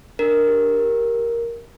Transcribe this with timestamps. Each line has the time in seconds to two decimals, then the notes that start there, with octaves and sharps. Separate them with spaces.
0.19 D4 A#4
0.48 G4
0.77 G4